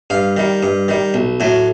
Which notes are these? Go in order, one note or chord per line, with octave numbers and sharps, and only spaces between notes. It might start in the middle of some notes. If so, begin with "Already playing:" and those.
G2 F5
D#3 G3
G2
D#3 G3
B1
A2 F#3 A3